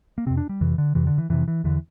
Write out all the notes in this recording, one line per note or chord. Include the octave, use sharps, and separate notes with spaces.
A#3
F2 C3 C4
D4
G3
F2 C3 E3
D3
F2 C3 E3
D3
E3
F2 C3 E3
E3
E2 D3 E3